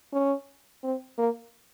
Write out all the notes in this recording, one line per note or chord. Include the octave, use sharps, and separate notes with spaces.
C#4
C4
A#3